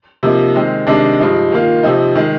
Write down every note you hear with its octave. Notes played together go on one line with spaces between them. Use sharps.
C3 F3 A#3 D#4
D#3 G#3 C4
C3 D#3 G#3 D4
G2 F3 G#3 D#4
D#3 A#3 F4
C3 F3 C4 D#4
D#3 G#3